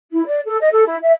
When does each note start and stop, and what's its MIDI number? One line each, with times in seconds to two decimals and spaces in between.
0.12 0.23 64
0.26 0.39 74
0.45 0.57 69
0.60 0.68 75
0.71 0.84 69
0.86 0.96 64
1.02 1.12 76